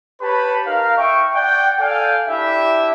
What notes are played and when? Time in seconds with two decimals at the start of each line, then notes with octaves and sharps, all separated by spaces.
0.21 G4 B4 C#5 A5 B5
0.66 D#4 A#4 F5
0.98 E5 G5 C#6
1.34 D5 F#5 G5
1.79 A4 D5 F5 G5 G#5
2.28 D4 E4 G4 E5